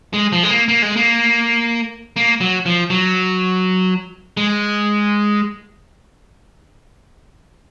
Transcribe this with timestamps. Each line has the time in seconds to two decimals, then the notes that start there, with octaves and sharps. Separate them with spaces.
0.13 G#3
0.32 F3
0.43 G#3
0.50 A#3
0.68 A#3
0.82 G#3
0.96 A#3
2.16 A#3
2.41 F#3
2.66 F3
2.90 F#3
4.37 G#3